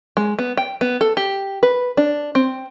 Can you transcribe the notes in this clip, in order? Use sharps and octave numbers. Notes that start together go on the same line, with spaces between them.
G#3
B3
G5
B3
A4
G4
B4
D4
C4